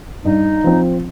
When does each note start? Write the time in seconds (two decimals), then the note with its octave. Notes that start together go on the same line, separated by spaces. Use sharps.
0.25 G2 D#4
0.64 F3 C4